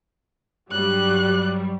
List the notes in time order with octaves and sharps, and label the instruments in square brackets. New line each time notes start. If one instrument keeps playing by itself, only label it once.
[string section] G2 F#3 G3 [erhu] F#6